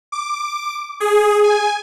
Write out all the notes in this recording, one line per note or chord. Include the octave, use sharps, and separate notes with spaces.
D6
G#4
G#5